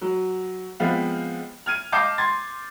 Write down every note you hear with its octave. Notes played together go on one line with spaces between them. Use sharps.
F#3
F3 G#3 B3 C4 F5
F6 G#6 D#7
D#5 F5 A5 D6 G6 C7
C6 G#6 A6